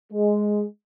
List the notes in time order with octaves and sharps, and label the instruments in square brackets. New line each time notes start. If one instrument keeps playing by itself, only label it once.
[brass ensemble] G#3